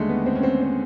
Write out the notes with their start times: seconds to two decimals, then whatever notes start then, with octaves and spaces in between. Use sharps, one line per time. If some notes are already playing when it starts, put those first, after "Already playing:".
Already playing: D#2 D3 G#3 A3
0.09 B3
0.26 C4
0.36 C#4
0.43 C4
0.61 C4